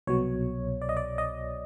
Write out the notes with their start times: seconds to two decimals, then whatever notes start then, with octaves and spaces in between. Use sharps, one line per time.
0.07 C2 B2 F#3 C#5
0.82 D5
0.89 D#5
0.97 D5
1.18 D#5